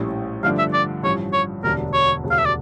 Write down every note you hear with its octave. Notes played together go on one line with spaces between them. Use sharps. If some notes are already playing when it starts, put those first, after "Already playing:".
Already playing: A#1 A2 G3 C#4
G2 D3 F3 A3 D4 F5
E5
D5
A1 G2 F3 C#4 C#5
C#5
E1 D2 D3 G3 D4 A#4
C#5
E1 D2 C#3 G3
F5
E5
D5